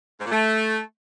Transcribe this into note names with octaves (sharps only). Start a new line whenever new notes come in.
G#2
A#2
A3